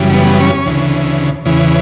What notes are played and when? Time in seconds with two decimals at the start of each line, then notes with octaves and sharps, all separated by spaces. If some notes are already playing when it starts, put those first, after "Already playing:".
Already playing: F#2 C#3 E3 G3
0.14 B3
0.41 C#4
0.66 D2 C#3 E3
1.45 E2 C#3 E3